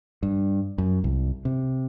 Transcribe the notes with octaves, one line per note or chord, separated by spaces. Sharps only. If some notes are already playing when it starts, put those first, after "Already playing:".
G2
F#2
C2
C3